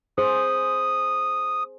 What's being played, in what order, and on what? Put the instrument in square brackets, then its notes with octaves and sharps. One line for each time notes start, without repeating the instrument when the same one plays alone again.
[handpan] G#4 C5 [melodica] D#6